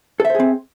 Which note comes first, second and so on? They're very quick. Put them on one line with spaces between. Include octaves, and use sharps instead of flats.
A4 E5 C5 G#4 C4